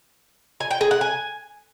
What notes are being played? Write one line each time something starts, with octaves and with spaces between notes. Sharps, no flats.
G#5
G5
G#4
F#5
G#5